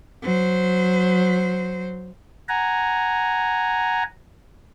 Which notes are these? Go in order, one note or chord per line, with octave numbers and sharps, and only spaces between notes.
F#3 C5
F#5 G#5 A#5